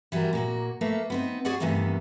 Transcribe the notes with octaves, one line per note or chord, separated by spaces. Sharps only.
E3 G3 F4 F#4 A#4
A#2 A#3 F#4
A3 A#3 B4 E5
B3 C4 D#4
F#4 G#4 C#5 D5 F#5
G2 C3 D#3 E3 A3 B3